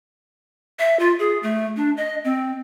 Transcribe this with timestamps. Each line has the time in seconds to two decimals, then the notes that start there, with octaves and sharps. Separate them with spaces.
0.79 E5
0.99 F4
1.19 G#4
1.43 A3
1.76 D4
1.97 D#5
2.24 C4